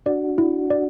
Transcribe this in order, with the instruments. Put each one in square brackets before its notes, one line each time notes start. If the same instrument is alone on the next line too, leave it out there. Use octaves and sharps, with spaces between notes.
[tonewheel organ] D4 F#4 [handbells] D5
[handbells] E4
D5